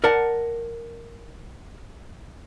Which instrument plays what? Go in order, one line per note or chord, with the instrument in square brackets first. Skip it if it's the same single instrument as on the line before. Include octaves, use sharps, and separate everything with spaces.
[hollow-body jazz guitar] A#4 D5 F#5 A5